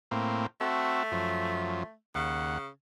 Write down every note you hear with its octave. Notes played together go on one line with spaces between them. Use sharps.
A2 A#3 C4
A3 C4 F#4 A4
F#2 F3
D#2 C#3 F#5